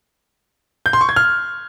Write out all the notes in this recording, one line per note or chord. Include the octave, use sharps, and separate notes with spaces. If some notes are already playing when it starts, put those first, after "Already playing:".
G6
C6
C#6
G#6
F6